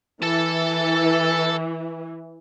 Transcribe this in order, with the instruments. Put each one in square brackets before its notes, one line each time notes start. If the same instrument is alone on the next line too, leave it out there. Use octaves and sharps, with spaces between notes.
[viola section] E3 [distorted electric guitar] A4 A5